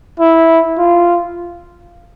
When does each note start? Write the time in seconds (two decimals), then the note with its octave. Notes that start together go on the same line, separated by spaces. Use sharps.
0.20 E4
0.78 F4